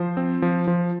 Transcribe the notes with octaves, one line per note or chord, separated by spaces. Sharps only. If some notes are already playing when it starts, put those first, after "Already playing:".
Already playing: F3 C5
C4
F3
F3